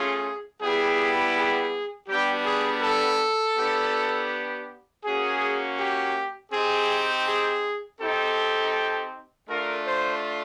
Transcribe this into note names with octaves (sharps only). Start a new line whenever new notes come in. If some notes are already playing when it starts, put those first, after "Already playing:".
Already playing: A3 C#4 F4 G#4
G3 B3 E4 G4 G#4
G#4
G3 B3 D4 G4
G#4
A4
B3 D4 G4
A#3 C#4 F#4 G#4
G4
C4 D#4 G4 G#4
G#4
C4 D#4 G4 A4
A3 D4 F4 A#4
C5